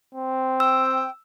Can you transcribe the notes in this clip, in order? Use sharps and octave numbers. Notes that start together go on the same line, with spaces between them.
C4
G5 E6